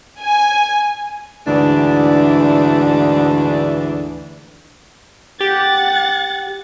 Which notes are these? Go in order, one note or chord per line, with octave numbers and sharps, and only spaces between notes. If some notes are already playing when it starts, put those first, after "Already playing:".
G#5
D2 G#2 E3 D4 D5
G4 F#5 A6